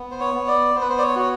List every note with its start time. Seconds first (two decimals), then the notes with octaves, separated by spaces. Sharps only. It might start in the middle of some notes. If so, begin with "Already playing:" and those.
Already playing: B3
0.11 C5
0.20 C#5
0.34 B3
0.48 D5
0.74 B3 C5
0.81 B4
0.90 C5
0.98 D5
1.02 C#5
1.16 F#4 C#5